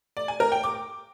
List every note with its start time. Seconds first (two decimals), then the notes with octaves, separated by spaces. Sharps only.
0.17 D5
0.28 G#5
0.40 A#4
0.52 G5
0.64 D6